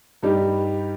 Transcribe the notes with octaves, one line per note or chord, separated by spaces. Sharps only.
G2 G3 D#4 G4